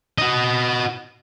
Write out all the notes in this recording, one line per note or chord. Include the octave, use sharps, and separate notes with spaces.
F#4 D#5